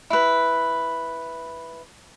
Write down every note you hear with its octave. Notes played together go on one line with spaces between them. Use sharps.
E4 B4